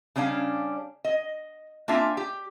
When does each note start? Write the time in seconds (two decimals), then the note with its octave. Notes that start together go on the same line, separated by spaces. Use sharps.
0.16 C#3 G3 C#4 D4 F5
1.04 D#5
1.88 A#3 C4 D4 F4 E5 G#5
2.17 G4